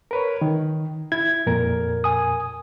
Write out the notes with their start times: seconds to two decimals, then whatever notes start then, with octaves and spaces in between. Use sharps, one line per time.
0.11 A#4 B4 C#5
0.42 D#3
1.12 E4 G#6
1.46 F2 A#2 A#4
2.04 G#5 D#6